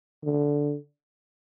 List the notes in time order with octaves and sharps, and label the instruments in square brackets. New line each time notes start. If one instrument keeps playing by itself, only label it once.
[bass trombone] D3